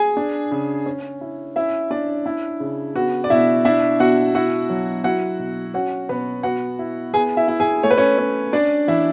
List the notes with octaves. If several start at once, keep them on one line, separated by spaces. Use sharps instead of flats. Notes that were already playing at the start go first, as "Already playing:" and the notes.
Already playing: G#4 G#5
D4
C#3
C#4
E4
C#4 E4 E5
D4 E4 D5
D4 E4
C#3
B3 F#4
D5
B2 E4 E5
D4 E4 E5
B2 F#4 F#5
E4 F#4 F#5
F#3
E4 F#4 F#5
B2
C#4 F#4 F#5
B2 B3 B4
B3 F#4 F#5
E4
B3 G#4 G#5
E4 E5
E4
G#4 G#5
A3 C#5
B4
C#4 C#5
C#4
D4 D5
E3 E4 E5